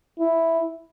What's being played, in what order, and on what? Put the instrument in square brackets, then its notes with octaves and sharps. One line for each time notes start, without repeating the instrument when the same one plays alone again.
[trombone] E4